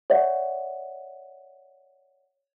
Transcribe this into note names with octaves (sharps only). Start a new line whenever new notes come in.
C#5 D5 E5 F#5